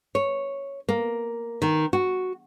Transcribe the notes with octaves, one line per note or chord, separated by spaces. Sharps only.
C#5
A#3
D#3
F#4